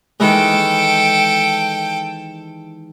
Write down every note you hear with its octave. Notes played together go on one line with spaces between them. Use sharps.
D#3 E3 G#3 A4 G5